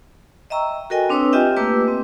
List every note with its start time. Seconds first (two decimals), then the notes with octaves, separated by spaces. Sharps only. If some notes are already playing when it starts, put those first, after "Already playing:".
0.50 D#5 E5 G5 A#5 C#6 E6
0.90 F#4 A4 A#4 D#5 G5 G#5
1.10 C4 D4 B4 C#5 D#6 E6
1.32 F4 G4 D#5 E5 G5 G#5
1.57 A3 A#3 G4 B4 D6 E6
1.88 C4